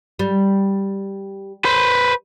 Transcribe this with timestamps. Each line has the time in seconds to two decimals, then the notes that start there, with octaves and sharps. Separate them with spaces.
0.19 G3
1.65 B4 C5